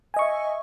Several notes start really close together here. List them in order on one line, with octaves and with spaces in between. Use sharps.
G#5 D#5 C#6 E5